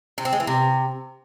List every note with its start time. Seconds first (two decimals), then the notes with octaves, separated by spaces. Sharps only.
0.18 C3
0.25 C4
0.33 G#3
0.40 E3
0.47 C3